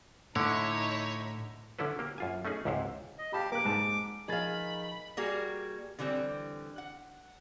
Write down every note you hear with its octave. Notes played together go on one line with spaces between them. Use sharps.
A2 D3 D#4 E4 C#5
D3 C#4 E4 A4 B4
A#3 G4
F#2 F4 G#5
A3 C#4 D#4 G#4
C#2 G#2 C3 E4 C5 C#5
D#5
G4 F5 A5 B5
A#3 D6 F#6
G#2 A5
D#3 F3 G#4 F5 B5 A6
G3 A#3 F#4 G#4
D3 E3 G3 C4
F#5